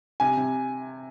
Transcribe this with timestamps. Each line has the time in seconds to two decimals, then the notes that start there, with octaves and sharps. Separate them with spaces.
0.20 C3 G#5
0.37 C3